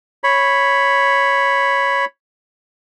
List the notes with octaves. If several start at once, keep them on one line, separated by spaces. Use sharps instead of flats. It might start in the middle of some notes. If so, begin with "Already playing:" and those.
C#5 B5